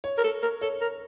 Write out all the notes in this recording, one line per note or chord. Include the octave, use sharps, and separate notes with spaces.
C#5
A#4
A4
A#4
A4 C#5
A#4